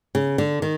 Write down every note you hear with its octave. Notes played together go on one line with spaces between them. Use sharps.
C#3
D3
D#3